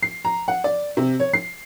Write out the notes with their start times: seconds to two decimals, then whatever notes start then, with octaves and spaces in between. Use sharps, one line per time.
0.03 C7
0.25 A#5
0.48 F#5
0.64 D5
0.97 C3
1.20 C#5
1.33 C7